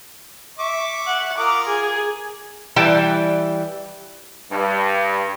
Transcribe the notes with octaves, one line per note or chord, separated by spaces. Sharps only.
E5 C#6 D6
F#5
F4 A#4 D6 D#6
G#4
E3 G3 G5 A5
G2